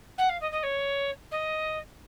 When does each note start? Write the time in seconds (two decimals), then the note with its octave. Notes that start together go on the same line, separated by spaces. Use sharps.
0.18 F#5
0.29 F5
0.41 D#5
0.52 D#5
0.63 C#5
1.31 D#5